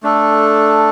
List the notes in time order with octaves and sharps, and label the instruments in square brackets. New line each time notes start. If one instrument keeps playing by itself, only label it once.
[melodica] A3 D4 A4